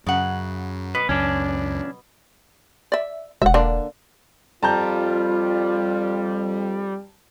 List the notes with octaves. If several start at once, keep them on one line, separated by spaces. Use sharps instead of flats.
F#2 C#3 F#5
B2 B4
C#2 F#2 C#4 D4
D5 E5
E1 E5 F#5
D3 A#3 D4
F2 G3 F4 A5 A#5 G6